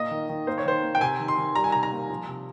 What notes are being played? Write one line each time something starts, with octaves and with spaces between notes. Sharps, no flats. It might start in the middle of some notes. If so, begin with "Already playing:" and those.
Already playing: A#2 A#3 D#5
D#3
D#3
A#3 C5
C#5
D#3 C5
A#3
G5
C3 G#5
D#3
C6
D#3
G3 A#5
G#5
C3 A#5
A#5
A#3
F3
C3